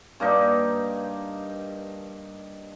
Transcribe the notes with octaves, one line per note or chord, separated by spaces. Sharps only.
G2 A#3 D4 D#4